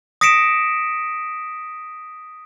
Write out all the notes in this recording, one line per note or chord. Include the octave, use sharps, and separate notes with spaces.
D#6 A#6 B6 C#7 D7 E7